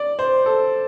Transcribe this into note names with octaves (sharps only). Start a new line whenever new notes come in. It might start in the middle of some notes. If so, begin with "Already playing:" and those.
Already playing: D5
C5
A4